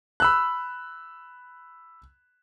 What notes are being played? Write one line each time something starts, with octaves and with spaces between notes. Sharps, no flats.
B5 E6 F#6